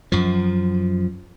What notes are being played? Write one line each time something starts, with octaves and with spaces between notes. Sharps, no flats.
F#2 F3